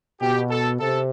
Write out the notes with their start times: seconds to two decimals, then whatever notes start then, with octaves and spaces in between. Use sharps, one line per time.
0.21 B2 G4
0.50 A4
0.80 C3 A4